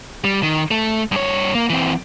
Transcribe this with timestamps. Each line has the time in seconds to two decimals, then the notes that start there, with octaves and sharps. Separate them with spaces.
0.24 G3
0.43 D#3
0.71 A3
1.12 G2 C#5
1.55 A#3
1.70 E3 C4